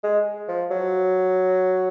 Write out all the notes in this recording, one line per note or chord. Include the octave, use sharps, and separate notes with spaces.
G#3
F3
F#3